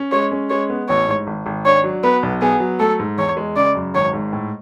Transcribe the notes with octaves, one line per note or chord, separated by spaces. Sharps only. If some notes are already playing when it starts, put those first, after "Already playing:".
Already playing: C#4
G#3 C#5
C#4
G#3 C#5
B3
A1 C#5
G#2
G#1
G#1
D4 C#5
F#3
B3 B4
B1
B3 G#4
F#3
A3 A4
G#2
E2 C#5
G#3
C#3 D5
F#2
G#1 C#5
G#2
A2